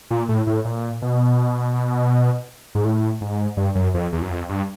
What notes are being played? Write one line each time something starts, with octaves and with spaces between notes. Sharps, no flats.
A#2
A2
A2
A#2
B2
G#2
A2
G#2
G2
F#2
F2
E2
F#2
F2
G2